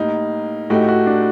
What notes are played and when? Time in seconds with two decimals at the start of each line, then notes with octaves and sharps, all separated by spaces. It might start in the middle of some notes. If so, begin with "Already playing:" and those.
Already playing: A2 G3 A#3 D#4
0.70 A2 A3 D#4 F#4 G4
0.89 F#4
1.07 D4